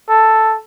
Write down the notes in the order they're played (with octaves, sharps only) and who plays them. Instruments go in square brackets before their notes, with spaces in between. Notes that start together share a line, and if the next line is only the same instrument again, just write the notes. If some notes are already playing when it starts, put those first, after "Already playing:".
[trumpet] A4